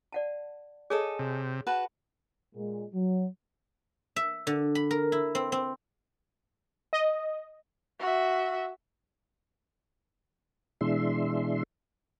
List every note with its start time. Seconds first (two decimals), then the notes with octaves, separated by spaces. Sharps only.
0.12 D5 F#5 A5
0.90 G#4 A4 C#5 D#5 G#5
1.19 C3
1.67 F#4 B4 A5
2.55 A#2 G#3
2.94 F#3
4.16 E5
4.47 D3
4.75 B5
4.91 A#4
5.12 E4
5.35 C4
5.52 C4
6.93 D#5
8.00 F#4 E5
10.81 B2 E3 G#3 D4 E5 C6